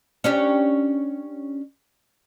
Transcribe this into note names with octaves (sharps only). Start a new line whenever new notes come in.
C#4 D4 G4